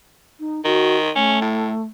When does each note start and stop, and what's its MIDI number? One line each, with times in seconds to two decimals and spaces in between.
0.39 0.63 63
0.65 1.11 51
0.65 0.96 66
1.15 1.82 57
1.15 1.41 61
1.41 1.72 45